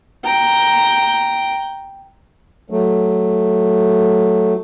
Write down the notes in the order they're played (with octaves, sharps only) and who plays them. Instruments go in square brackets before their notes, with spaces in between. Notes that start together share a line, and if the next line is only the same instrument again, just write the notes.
[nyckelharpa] G5 A#5
[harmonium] F#3 A3